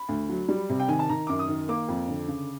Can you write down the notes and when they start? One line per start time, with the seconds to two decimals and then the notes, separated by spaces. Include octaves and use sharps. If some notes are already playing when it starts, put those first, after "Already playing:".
Already playing: B5
0.09 D2
0.29 F#3
0.48 G3
0.69 C3
0.80 G5
0.88 D#3 G#5
0.99 A5
1.09 D#3 A#5
1.27 F#2 D6
1.39 D#6
1.48 D#3
1.69 A#3 D6
1.88 F2
2.08 D3
2.28 C#3